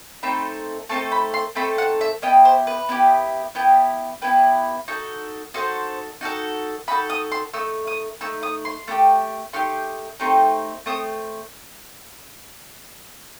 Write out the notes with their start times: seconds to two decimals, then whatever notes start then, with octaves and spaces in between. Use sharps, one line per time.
0.23 A3 C4 D#4 A4 B5
0.89 A3 C4 D#4 A4 A5
1.12 B5
1.34 C6
1.55 A3 C4 D#4 A4 B5
1.78 F#5
2.01 E5
2.22 B3 E4 G4 D#5
2.45 C5
2.67 B4
2.89 B3 E4 G4
3.55 B3 E4 G4
4.22 B3 E4 G4 B4
4.88 D#4 F#4 A4
5.54 D#4 F#4 A4 C5
6.21 D#4 F#4 A4
6.88 D#4 F#4 A4 B5
7.10 D#6
7.32 C6
7.54 A3 D#4 E6
7.87 D#6
8.21 A3 D#4 E6
8.43 D#6
8.65 C6
8.88 A3 D#4 G4
9.53 A3 D#4 G4 C6
10.20 A3 C4 D#4 G4
10.86 A3 C4 D#6